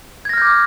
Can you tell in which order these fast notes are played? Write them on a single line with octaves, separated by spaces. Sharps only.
G#6 A#6 F6 G6 D6